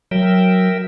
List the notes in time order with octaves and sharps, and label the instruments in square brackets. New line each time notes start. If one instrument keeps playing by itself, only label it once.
[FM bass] F#3 [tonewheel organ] A#4 E5 G5